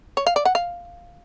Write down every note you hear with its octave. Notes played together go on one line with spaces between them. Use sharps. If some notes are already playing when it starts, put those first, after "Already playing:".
C#5
F5
D5
F#5
F5